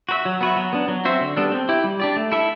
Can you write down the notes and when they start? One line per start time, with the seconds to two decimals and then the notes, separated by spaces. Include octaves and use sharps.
0.09 F#4 B4 E5
0.25 F#3
0.41 B3 F#4 B4 E5
0.56 F#3
0.73 B3 D4
0.88 F#3
1.05 C4 F#4 C5 E5
1.21 D3
1.36 G3 B3 D4 A4
1.52 C4
1.69 E4 G4
1.84 G3
2.00 D4 G4 D5
2.16 A3
2.32 E4 A4 E5